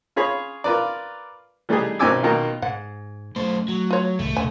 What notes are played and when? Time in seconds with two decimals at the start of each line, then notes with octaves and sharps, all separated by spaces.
0.16 F4 G#4 C#5 B5
0.64 F4 A#4 B4 D5
1.69 E3 G3 A3 D#4 G4 G#4
1.99 G#1 B2 C4 G#5 D6 E6
2.23 B2 D#3 A#3 F4
2.62 G#2 F#5
3.36 F#2 A3 C5
3.68 F#3
3.90 F4 C#5
4.19 C2 G#2 D#3 A3
4.37 D#1 C#2 C#4 G#5